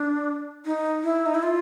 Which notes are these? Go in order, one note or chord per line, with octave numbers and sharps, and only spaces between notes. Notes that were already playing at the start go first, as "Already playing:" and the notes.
Already playing: D4
D#4
E4
D#4
E4
F4